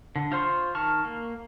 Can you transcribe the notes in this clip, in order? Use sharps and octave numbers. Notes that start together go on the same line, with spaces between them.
D3
F4 C5 C6 C#6
D#3 A5 C#6 F6
A#3